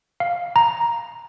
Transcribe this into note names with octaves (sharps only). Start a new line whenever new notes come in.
F5
A#5